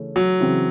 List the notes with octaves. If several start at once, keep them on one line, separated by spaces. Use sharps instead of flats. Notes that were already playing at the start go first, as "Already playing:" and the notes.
Already playing: C#3 E3 A3 C#4
F#3
C#3 E3 C4